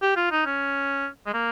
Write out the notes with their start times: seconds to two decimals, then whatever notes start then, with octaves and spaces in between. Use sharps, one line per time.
0.02 G4
0.17 F4
0.31 D#4
0.46 C#4
1.27 G#3
1.34 A#3